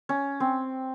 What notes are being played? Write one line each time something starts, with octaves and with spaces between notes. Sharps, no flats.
C#4
C4